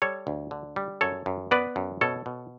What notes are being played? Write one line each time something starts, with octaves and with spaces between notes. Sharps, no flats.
G3 A4 C#5
D2
D3
G3
F#2 A4 C#5
F#2
B3 B4 D5
F#2
B2 A4 C#5
B2